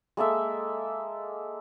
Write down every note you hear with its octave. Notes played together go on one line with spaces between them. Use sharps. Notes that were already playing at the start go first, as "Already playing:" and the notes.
G#3 A#3 A4 E5